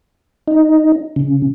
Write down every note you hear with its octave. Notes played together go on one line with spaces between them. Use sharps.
D#4
C#3